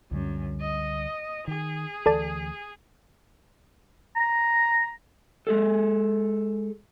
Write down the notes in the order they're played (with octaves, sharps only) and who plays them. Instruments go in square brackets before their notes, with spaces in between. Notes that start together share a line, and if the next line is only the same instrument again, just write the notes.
[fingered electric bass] C#2 D3 G3 [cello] F#2
[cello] D#5
[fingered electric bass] D#3 [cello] G#4
[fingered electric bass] D2 E3 [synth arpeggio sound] A4 D5 A5
[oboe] A#5
[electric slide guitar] G#3 G#4 A4